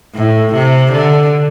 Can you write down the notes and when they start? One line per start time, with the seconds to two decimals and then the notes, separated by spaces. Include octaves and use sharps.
0.15 A2
0.54 C3
0.92 D3